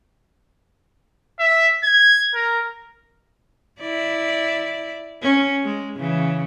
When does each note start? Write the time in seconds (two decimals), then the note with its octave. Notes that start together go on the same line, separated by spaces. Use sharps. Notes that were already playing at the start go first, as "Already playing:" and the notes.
1.39 E5
1.84 G#6
2.34 A#4
3.81 E4 D5
5.22 C#4
5.64 G#3
5.97 C#3 E3